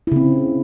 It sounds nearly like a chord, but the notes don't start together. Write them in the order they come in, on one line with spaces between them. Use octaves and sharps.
E4 C#3 C4